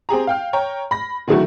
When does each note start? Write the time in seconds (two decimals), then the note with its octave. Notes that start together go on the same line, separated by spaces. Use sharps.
0.09 C4 G4 G#4 A#5
0.27 F5 G5 F6
0.53 C#5 G5 A#5
0.91 B5 A#6
1.28 D3 D#3 F#3 A3 E4 F#4